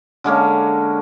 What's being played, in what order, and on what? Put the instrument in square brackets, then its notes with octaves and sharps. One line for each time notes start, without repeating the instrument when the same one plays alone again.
[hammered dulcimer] D3 G#3 A#3 C#4